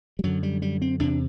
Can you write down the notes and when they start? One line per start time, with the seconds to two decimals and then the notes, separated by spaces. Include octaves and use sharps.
0.19 G3
0.23 F#2 D3 F#3
0.43 G3
0.62 G3
0.82 C4
1.00 E2 C3 D4